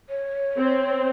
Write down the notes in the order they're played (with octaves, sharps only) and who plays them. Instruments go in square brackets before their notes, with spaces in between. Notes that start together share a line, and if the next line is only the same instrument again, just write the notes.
[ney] C#5
[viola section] C4